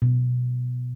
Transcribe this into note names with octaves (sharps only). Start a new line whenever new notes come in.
B2